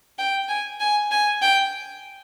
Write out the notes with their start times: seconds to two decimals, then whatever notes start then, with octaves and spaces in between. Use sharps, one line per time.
0.19 G5
0.49 G#5
0.80 G#5
1.11 G#5
1.42 G5